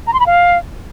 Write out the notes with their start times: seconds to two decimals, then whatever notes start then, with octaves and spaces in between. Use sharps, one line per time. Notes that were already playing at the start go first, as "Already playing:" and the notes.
0.07 A#5
0.13 C6
0.20 B5
0.26 F5